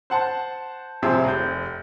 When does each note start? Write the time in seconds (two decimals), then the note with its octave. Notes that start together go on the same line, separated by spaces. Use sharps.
0.10 C5 F#5 A5
1.02 A1 C3 F3 G#4 C5 E5
1.24 F1 G6